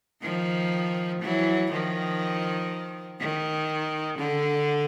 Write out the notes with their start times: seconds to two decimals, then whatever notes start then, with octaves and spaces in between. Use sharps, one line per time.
0.23 D#3 F3
1.22 E3 F#3
1.71 D#3 F3
3.20 D#3
4.19 D3